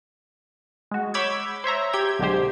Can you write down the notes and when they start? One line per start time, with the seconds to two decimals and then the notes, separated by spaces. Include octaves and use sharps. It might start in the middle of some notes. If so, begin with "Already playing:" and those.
0.91 G#3 F#4
1.14 C#5 B5 D6 E6 G6 G#6
1.64 C5 C#5 E5 A#5
1.93 G4 G5 G#6
2.19 B1 D3 G#3 G4 C5
2.34 C3